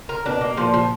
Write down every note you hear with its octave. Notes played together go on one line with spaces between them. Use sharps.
A#4
B2 D4
A#3
A#2 F3
F3